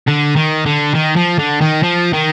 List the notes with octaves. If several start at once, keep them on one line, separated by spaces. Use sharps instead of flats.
D3
D#3
D3
D#3
F3
D3
D#3
F3
D#3